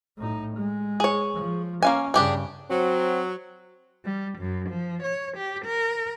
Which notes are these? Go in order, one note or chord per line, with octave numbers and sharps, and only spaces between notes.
A2 D#4
G#3
G#4 C#5
F3
A#3 C#4 F5 G#5
G2 C#3 D4 G4 G#4
F#3 C4
G3
F#2
F3
C#5
G4
A#4